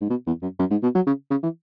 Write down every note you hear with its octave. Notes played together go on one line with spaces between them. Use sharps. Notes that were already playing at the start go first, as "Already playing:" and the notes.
G#2
B2
E2
F#2
F#2
G#2
B2
F#3
C#3
C#3
E3